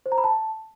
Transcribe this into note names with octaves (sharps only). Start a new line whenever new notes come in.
C5
A#5
B5
A5